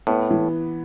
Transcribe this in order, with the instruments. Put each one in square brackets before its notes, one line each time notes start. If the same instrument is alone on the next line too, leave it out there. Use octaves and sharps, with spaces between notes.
[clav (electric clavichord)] A2 [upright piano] B3
[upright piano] E3